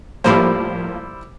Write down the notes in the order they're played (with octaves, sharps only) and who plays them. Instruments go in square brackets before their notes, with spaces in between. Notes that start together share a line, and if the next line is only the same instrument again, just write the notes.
[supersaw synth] A2 F3 A#3 [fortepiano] G3 E4 C5